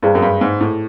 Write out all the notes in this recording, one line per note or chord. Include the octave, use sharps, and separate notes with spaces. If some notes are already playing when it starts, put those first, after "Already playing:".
G2 E4 G#4 C5
F#2
G2
G#2
A2